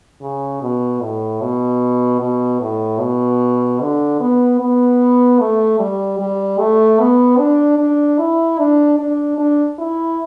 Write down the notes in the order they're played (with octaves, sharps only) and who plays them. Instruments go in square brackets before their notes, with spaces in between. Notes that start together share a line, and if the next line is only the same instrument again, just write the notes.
[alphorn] C#3
B2
A2
B2
B2
A2
B2
D3
B3
B3
A3
G3
G3
A3
B3
D4
D4
E4
D4
D4
D4
E4